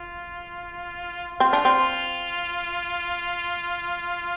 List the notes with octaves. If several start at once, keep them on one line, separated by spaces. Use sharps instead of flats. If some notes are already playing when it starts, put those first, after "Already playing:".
Already playing: F4
C4 F4
D4
C4